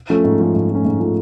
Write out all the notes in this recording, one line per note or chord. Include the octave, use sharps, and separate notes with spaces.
F3 A3 C#4
G#2
F3 A3 C#4
G#2
F3 A3 C#4
G#2
F3 A3 C#4